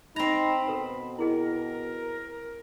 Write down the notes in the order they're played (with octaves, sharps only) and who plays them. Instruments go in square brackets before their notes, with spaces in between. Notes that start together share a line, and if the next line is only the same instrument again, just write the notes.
[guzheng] C4 A#5 [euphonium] D#4 [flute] B5
[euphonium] B2 [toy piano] A4 B4
[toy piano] E4 G#4 D#5 [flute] A#4